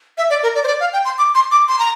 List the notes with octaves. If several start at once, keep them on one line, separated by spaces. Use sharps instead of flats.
E5
D5
A#4
D5
C5
D5
F5
G5
C6
D6
C6
D6
C6
A#5